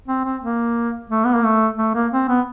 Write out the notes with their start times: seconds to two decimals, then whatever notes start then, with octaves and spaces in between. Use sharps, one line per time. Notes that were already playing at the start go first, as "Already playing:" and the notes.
0.08 C4
0.25 C4
0.42 A#3
1.10 A3
1.25 B3
1.34 A#3
1.44 A3
1.78 A3
1.95 A#3
2.13 C4
2.29 B3